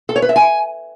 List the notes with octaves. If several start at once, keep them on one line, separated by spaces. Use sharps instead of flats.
A4
C#5
B4
E5
G#5